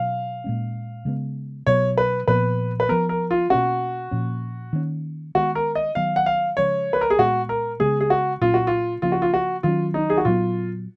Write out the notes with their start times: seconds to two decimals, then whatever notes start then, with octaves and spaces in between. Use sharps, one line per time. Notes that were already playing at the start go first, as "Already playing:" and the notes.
Already playing: B2 F#3 C#4 F5
0.44 A#2 G#3 C#4
1.05 C#3 G#3 B3
1.67 B2 F#3 B3 C#5
1.98 B4
2.28 A#2 F3 B3 B4
2.80 B4
2.89 F3 B3 A#4
3.09 A#4
3.31 F4
3.50 B2 A#3 C#4 F#4
4.11 A#2 F3 A#3 C#4
4.73 D#3 A#3 C#4
5.35 D#3 G#3 B3 F#4
5.55 A#4
5.75 D#5
5.95 D#3 F#3 B3 F5
6.16 F#5
6.26 F5
6.57 C#3 F3 G#3 C#4 C#5
6.93 B4
7.01 A#4
7.10 G#4
7.19 A#2 G#3 B3 F#4
7.49 A#4
7.80 C#3 G#3 B3 G#4
8.00 G#4
8.10 F#4
8.41 A#2 F#3 A#3 C#4 F4
8.54 F#4
8.67 F4
9.02 C#3 F3 A#3 C#4 F4
9.12 F#4
9.22 F4
9.34 F#4
9.63 D#3 F#3 C#4 F4
9.94 D#4
10.10 G#4
10.18 F#4
10.25 A#2 F#3 B3 F4